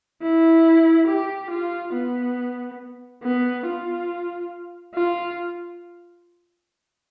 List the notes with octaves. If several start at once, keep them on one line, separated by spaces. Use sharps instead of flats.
E4
G4
F4
B3
B3
F4
F4